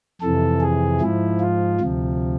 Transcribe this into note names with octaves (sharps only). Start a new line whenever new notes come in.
F2 C3 E3 A4
G#4
G#2 F3 E4
F4
D2 C3 F3